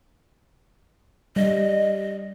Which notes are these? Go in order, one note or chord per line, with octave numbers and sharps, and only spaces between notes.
G3 D#5